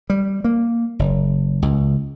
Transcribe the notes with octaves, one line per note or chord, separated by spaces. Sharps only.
G3
A#3
F#1
C#2